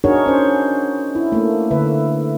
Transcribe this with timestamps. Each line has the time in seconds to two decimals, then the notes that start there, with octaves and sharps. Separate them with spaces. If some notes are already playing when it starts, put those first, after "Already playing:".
0.04 D4 D#4 F#4 G#4 A#4 C#5
0.26 C#4 C5
1.15 E4
1.32 A3 A#3
1.71 D3 B4 E5